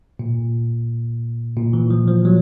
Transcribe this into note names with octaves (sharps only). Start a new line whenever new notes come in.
A#2
A#2
E3
F3
F3
F#3